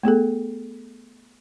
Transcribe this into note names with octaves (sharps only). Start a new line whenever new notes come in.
A3 B3 G#4 A4